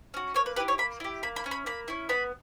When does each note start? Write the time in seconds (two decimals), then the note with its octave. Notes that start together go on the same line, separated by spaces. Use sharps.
0.14 C#4 F#4
0.34 A#3 C#5
0.46 B4
0.56 E4 G4 B4
0.68 C#5
0.78 A#3 B5
1.00 E4 G4
1.23 A#3 B5
1.36 B5
1.44 C#4 E4
1.51 B5
1.66 A#3 B5
1.88 C#4 E4
2.09 B3 B5